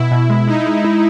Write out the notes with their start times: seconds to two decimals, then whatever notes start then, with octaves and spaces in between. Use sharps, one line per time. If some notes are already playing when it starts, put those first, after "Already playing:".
Already playing: B2 E4
0.11 B2
0.30 G#3
0.47 G#3 D#4
0.66 G#3
0.84 E4